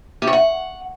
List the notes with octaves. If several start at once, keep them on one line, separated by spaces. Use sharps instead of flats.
G4
C#5
F#5